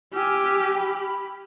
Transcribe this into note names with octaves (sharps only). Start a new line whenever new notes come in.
G4 G#5 E6 F6
B5